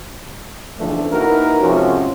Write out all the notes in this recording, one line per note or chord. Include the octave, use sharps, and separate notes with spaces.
B1 C#3 E3 F3 A3 D4
A#3 D#4 E4 F#4 A#4 B4
C3 F3 G#3 C#4 F#4